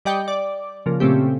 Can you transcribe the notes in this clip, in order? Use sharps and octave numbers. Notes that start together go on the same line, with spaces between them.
G3 D5 D#5 G5 C#7
D5
C#3 F3 A#3
A#2 C#3 A3 C4 G4